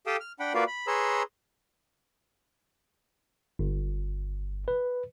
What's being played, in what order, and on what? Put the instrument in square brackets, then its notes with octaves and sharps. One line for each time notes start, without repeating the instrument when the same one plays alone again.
[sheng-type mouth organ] G4 A4 F5 G5 A5 D#6
F6
D4 F#5 G5 B5
A#3 F4 F#4 B4 D5 F5
B5
G#4 B4 C#5 A#5 C6 E6
[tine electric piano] G1
B4